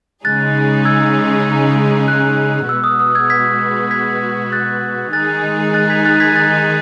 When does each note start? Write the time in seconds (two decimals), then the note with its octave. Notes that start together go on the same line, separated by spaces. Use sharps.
0.25 C#3 G#3 D#4 G#4 F#6 A6
0.85 E6 G#6
2.08 F#6
2.69 B2 G#3 B3 F#4 E6
2.84 D#6
2.99 D#6
3.15 E6 G#6
3.30 G#6 B6
3.91 G#6 B6
4.52 F#6 A6
5.13 D#3 G#3 D#4 G#4 F#6 A6
5.74 F#6 A6
5.90 G#6 B6
6.05 F#6 A6
6.20 G#6 B6
6.36 F#6 A6